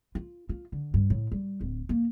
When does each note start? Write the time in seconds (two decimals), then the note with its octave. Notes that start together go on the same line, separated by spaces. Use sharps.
0.15 F4
0.49 F4
0.72 D3
0.94 G2
1.10 A2
1.32 G3
1.61 D1
1.89 A#3